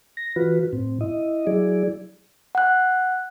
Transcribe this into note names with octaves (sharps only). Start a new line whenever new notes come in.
A#6
E3 F4 F#4 B4
A2 C4
E4 D#5
F#3 E4 G#4 D5
F#5 F#6